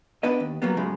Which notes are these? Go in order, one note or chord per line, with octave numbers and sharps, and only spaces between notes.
B3 D4 B4 D#5
D#2
F#3 G3 A#3 B3
F#2 A2 C#3 G#3